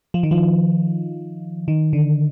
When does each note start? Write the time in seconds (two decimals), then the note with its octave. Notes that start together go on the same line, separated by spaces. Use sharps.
0.14 F3
0.23 D#3
0.31 F3
1.68 D#3
1.93 D3